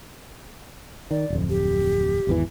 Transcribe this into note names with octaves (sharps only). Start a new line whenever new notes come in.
D#3 D5
D1 F2
G4
G#1 E2 E3